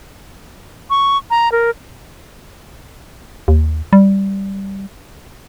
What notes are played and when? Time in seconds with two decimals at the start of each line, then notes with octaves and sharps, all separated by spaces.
0.90 C#6
1.30 A#5
1.52 A#4
3.48 D#2
3.93 G3